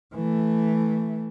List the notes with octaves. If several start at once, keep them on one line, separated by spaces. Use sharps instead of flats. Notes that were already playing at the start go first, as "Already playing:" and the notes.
E3 A3